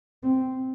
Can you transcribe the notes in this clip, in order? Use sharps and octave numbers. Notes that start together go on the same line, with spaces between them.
C4